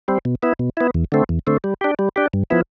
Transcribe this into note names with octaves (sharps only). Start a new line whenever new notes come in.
G3 C4
B2
B3 E4
B2
B3 E4
E2
D3 A3 C4
E2
D3 A3 C4
G3
D4 G4
G3
D4 G4
G2
F3 B3 E4